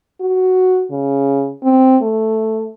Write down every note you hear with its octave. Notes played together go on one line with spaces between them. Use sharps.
F#4
C#3
C4
A3